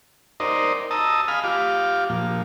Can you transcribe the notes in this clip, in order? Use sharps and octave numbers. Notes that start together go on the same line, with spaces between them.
D#4 A#4 C5 D5 D#5
D#5 A5 A#5 D#6 E6
F5 G#5 B5 D#6 F6
F4 G4 F5 D6
A#2 F3